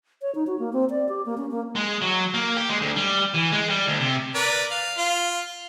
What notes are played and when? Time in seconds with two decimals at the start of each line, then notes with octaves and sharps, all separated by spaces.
0.22 C#5
0.35 D#4
0.47 F#4
0.59 A#3
0.73 C4
0.90 D5
1.09 G4
1.26 A#3
1.37 C#4
1.51 A#3
1.76 G#3
2.02 F#3
2.34 A#3
2.57 G4
2.69 G#3
2.81 D2
2.96 G3
3.34 E3
3.52 G#3
3.70 G3
3.88 D2
4.00 C3
4.35 A#4 B4 D5
4.71 F5
4.97 F4